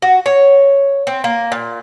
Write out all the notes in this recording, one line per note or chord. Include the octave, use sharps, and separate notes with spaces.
F#4
C#5
C4
A#3
A#2